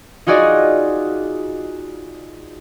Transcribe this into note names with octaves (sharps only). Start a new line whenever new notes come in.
D#4 F4 F#4 G#4 D5 D#5